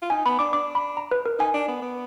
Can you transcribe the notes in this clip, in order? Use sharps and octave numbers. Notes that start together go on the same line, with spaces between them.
F4
D#4 G#5
B3 B5
D4 D6
D4 D6
B5
A#5
B4
A#4
D#4 G#5
D4
B3
B3